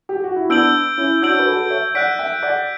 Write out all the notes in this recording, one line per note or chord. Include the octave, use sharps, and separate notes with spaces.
G4
F#4
E4
B3 D4 E6 G6 D7 F#7
C#4 E4
D4 F#4 E6 G6 D7 F#7
C#5
B4
F#4 A4
C#5 E5
D5 F#5 F#6 B6 D7
E5 G5
D5 F#5